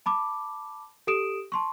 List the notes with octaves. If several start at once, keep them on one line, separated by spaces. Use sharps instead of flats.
A5 B5 D6
G4 A4 D#6 D7 E7
A5 C6 C#6